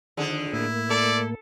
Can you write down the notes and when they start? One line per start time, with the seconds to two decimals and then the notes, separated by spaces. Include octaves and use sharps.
0.17 F2 D3 D#3 G#4
0.53 A2 A#3 E4
0.90 A4 D5